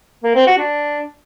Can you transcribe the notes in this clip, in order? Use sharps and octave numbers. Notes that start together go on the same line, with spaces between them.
A#3
C4
F#4
D4